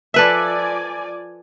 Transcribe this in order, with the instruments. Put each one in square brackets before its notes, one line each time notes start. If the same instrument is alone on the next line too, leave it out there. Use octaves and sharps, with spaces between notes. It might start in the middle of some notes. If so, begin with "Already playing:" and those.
[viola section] F3 D5 G#5 [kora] A4 B4 E5